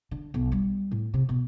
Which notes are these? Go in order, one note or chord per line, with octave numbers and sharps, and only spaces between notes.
D3
B1
G3
A2
C3
B2